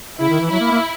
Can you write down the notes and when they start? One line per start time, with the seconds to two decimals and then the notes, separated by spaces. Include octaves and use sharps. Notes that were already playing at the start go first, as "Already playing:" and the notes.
0.20 C#3 E4
0.29 D#3
0.41 E3
0.50 F#3 E4
0.60 A#3
0.71 A#3